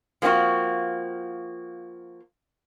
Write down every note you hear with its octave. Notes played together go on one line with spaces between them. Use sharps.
F3 A#3 C4 F4 F#4